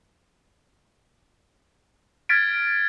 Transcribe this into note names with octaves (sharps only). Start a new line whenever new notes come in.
F6 G#6 A6 B6 D7